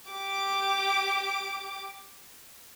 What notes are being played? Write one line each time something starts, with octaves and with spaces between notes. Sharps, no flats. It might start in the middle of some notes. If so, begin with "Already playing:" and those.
G4 D6